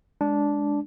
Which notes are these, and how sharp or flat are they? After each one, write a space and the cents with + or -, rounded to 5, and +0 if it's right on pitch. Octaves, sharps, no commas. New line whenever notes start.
G#3 +0 D4 -10